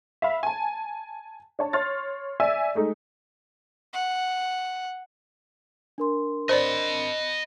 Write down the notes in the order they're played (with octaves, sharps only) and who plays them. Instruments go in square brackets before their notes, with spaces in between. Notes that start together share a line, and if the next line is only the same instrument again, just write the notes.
[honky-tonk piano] E5 F5 B5
G#5 A5
D4 C#5 A5
C#5 C6 F6 A6
D5 E5 G#5 E6
G#3 A3 D#4
[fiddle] F#5
[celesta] D4 A#4 C6
[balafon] C5 D5 [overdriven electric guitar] D#5 B5